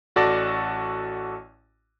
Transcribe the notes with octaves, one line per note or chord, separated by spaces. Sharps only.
A1 F#4 A4 D5 A5 A#6